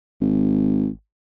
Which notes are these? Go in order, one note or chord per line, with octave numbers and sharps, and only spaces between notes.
G#1